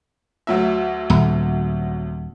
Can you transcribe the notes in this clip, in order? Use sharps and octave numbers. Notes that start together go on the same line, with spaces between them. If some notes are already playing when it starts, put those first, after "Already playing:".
D2 F#3 E5
D#1